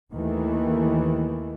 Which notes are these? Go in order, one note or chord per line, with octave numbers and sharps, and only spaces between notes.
D#2 D#3 E3 A3